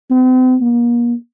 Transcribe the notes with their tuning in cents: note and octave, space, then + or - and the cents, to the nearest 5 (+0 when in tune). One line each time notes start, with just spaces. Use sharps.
C4 -40
A#3 +35